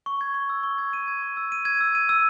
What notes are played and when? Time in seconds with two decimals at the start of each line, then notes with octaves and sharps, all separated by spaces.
0.06 C#6
0.21 G#6
0.34 C#6
0.49 E6
0.63 C#6
0.78 G#6
0.93 D#7
1.08 G#6
1.22 C#6
1.37 E6
1.52 D#7
1.65 G#6
1.81 E6
1.95 D#7
2.09 E6